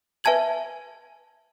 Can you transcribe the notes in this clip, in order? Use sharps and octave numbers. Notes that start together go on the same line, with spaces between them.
B4 E5 G#5 A5 G#6 F#7